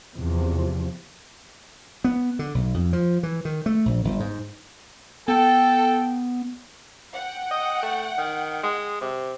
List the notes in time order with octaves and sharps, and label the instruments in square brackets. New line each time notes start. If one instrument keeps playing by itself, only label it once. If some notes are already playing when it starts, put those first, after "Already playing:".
[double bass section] E2 C3 F3
[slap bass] B3
D3
B1
F2
F3
E3
D#3
A3
A#1
G1
G#2
[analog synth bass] B3 [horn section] A4 G5
[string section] F#5 G5
[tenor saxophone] D#5
A3
D#3
G#3
C3